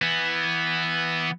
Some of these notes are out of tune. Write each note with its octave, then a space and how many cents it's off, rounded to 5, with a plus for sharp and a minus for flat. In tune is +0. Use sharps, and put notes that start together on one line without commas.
E3 +0 B3 +0